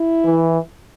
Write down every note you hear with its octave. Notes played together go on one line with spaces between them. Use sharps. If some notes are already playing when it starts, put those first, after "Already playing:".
Already playing: E4
E3